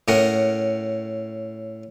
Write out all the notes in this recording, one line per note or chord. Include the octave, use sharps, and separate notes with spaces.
A2 C#4 A#4 F#5